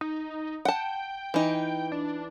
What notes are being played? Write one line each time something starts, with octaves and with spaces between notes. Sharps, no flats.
D#4
F#5 G5 A5
E3 D#4
D4